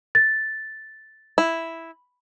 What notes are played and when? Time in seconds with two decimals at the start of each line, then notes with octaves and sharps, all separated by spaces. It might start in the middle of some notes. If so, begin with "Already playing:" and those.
0.15 A6
1.38 E4